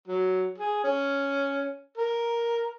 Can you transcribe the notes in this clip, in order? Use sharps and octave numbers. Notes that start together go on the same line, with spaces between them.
F#3
G#4
C#4
A#4